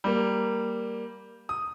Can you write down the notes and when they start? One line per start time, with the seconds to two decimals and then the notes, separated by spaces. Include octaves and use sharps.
0.04 G3 A#3
1.49 D#6